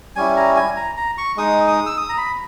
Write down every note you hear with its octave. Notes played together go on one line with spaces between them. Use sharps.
G3 C#4 E4 G#5
A#5
G#5
A#5
A#5
C#6
G#3 D#4 D#6
D#6
E6
D#6
A#5
B5